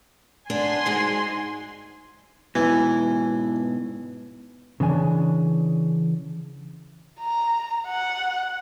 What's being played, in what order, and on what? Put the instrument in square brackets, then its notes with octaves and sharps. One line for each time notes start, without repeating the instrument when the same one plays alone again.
[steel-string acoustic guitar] B3 D4 [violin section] G#5 C6
[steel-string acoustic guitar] G#2 G#3 F#4
[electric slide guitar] G#2 B2 [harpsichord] E3
[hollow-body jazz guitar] C#3 E3 D4 G#5
[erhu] A#5
F#5